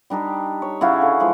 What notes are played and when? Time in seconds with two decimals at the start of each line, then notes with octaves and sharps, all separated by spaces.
0.10 G3 D4 D#4 G4
0.62 C#5
0.81 C#3 E4 F#4 F5
1.02 D3
1.20 E3 F3 G#3